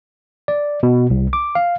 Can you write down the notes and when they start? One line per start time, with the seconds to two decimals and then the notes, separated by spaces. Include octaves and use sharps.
0.48 D5
0.83 B2
1.10 C2
1.33 D6
1.55 F5